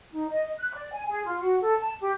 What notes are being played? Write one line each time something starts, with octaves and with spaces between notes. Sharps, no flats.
D#4
D#5
F#6
D5
G#5
G#4
F4
F#4
A4
A5
G4